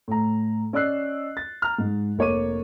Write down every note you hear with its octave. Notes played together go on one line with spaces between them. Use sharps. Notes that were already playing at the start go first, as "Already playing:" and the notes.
A2 A#5
C#4 D5 D#5 E6 F#6 C7
A6
A#5 F6
G#2
F1 A#3 C#5 D6 D#7